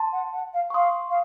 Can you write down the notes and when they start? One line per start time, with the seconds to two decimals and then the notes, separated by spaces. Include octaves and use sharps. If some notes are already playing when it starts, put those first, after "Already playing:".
Already playing: A5 C6
0.12 F#5
0.32 F#5
0.53 F5
0.70 C#6
0.74 F5 C6 D#6
1.09 F5